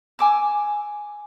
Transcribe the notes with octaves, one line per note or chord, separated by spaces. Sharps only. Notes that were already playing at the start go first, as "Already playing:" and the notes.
G#5 D6 E6